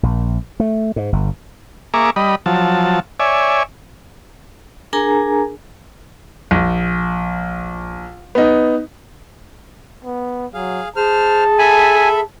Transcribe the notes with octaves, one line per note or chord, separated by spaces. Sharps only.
A#1
A3
G#2
G1
A#3 G#4 E5 A#5 C#6 D6
G3 D#5 B5
F3 F#3 A5
C#5 D5 E5 G#5
D4 G#4 A#4 G#5 A#5
A#1
B3 D#4
B3
F#3 G#4 F5
G#4 C5 A5 F6
A4 E5 G#5 B5